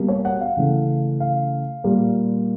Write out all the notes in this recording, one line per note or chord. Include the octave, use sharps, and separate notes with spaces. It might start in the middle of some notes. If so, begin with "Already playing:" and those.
Already playing: B2 G3 A#3
C#5
F#5
F5
C#3 E3 A3
F5
A#2 G3 A#3